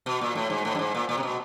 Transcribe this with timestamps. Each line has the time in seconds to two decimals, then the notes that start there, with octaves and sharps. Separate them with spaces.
0.06 B2
0.21 A#2
0.35 A2
0.50 G#2
0.65 A2
0.75 G2
0.79 G#2
0.95 A#2
1.09 A#2
1.18 C3
1.23 B2